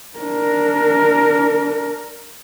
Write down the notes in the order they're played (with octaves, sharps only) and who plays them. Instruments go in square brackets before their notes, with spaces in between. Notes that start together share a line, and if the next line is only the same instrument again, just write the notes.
[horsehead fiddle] D4 A#4